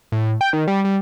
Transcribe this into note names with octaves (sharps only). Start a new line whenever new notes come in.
A2
G5
D#3
G3
G3